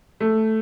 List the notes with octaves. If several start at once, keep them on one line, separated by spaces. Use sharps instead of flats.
A3